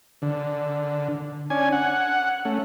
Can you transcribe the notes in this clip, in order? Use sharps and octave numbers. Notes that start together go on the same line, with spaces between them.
D3
C#4 D4 G#5
F#5
A3 C#4